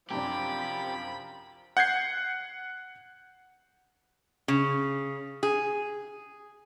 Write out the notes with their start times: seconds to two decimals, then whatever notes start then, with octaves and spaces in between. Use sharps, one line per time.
0.11 F#2 C3 F3 D4 G4 B5
1.77 F#5 G6 G#6 C7
4.48 C#3
5.43 G#4